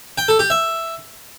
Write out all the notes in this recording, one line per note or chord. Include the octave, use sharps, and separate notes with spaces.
G5
A4
G4
E5